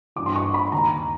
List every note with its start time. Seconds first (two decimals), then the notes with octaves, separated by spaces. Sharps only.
0.16 G2 E3 D6
0.26 C6
0.36 C#6
0.54 B5
0.72 D#2 D#3 A#5